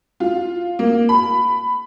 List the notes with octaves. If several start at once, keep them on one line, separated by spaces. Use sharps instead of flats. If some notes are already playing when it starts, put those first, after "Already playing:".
F4
A#3
B5